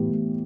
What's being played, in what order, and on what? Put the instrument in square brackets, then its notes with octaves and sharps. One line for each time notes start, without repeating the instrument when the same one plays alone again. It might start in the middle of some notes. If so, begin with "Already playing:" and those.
Already playing: [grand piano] A2 E3 B3 G4
A2